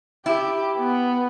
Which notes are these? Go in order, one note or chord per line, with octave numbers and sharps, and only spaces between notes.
E4 G4
B3